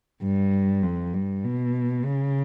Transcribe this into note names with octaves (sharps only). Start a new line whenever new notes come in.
G2
F2
G2
B2
C#3